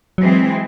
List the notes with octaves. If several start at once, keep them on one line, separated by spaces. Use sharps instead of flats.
E3 F#3 G#3 C4